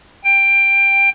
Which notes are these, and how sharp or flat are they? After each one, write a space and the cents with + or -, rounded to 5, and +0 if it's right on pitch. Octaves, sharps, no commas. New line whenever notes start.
G5 +15